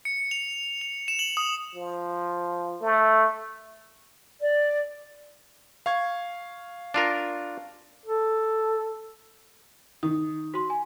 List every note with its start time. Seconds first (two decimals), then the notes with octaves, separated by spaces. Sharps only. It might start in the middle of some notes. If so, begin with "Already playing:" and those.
0.05 C#7
0.31 F7
0.81 F7
1.08 E7
1.19 F#7
1.37 D#6
1.75 F3
2.81 A3
4.41 D5
5.86 F5 C#6 G#6
6.94 D4 F4 A#4
8.06 A4
10.03 D#3 D#6
10.54 F#4 C6
10.70 G#5